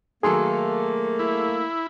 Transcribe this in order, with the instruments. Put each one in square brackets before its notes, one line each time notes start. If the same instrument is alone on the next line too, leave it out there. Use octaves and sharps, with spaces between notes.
[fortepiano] D#3 F#3 A4 [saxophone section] A3 A#3 [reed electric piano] G#4 C6
[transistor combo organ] E4